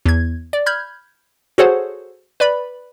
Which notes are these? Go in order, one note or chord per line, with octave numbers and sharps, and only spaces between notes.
E2 G#6
D5
B5 F6 G6 G#6
F#4 G#4 A4 C5 C#5 F#5
B4 D5 B5